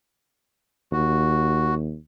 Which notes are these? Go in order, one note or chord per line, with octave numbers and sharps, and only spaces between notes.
D#2 F#4